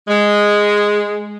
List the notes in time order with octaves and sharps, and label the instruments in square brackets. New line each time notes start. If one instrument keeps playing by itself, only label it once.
[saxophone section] G#3